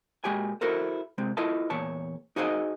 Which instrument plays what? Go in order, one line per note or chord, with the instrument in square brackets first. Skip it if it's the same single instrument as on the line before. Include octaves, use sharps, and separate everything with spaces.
[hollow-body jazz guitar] A#2 G#3 F#4 G4 G5 G#5
E4 F#4 A4 A#4 C5
C3 G#3 C4
E4 F4 A4 B4 D#5 A5
E2 A#2 C#5 A5
D#4 F#4 G#4 C5 D#5 F5